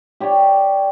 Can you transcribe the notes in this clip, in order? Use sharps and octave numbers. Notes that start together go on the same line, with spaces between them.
G4 C#5 D5 G5